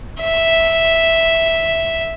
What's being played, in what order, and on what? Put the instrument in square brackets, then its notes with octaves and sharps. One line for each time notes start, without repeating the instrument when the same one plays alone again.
[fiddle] E5